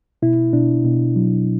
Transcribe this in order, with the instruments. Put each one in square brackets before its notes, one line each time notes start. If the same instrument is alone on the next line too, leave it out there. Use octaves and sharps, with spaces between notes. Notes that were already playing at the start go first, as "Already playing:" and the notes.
[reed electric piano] B2 E4
B2 D4
B2
F#3